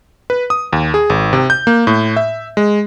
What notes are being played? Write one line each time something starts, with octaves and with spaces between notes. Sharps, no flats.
B4
D#6
D#2
G#4
G#1
C3
G6
A#3
A2
E5
G#3